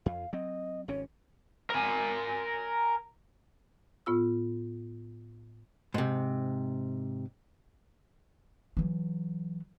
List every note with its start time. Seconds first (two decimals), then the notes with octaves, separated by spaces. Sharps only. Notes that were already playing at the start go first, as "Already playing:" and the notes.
0.06 F2 F5
0.33 F#3 C4 D#5
0.88 G#1 C3 C#4 C#5
1.70 A#4 G#5
4.06 A2 B3 F4 E6
5.94 G#2 C3
8.77 E3 F#3